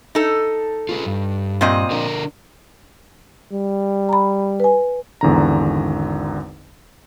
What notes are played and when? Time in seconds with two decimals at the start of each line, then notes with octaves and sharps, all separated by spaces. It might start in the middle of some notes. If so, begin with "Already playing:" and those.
0.15 D#4 A4
0.89 F4 G#4 B4
1.06 G2
1.61 A#2 C4 D#5
1.91 D3 D4 A#4
3.52 G3
4.09 A#5 B5
4.60 B4 G#5
5.21 G#1 E2 D3 A#5